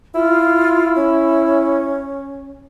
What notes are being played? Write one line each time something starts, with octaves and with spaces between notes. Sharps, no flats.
E4 F4
C#4